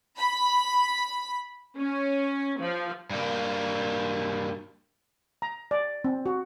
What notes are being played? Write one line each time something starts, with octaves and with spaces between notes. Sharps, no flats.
B5
C#4
F3
G2 A#3
A#5
D5
C4
F#4